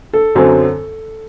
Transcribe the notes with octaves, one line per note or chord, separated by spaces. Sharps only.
A4
F#2 D3 F#3 C4